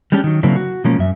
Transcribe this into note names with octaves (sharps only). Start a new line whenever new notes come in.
G3 G#3 C#4 D4 G4
D#3 F#3
C#3 F#3 A#3 C4 D4 E4
F#4
B2 F3 G#3 A#3 C#4
F#2 E5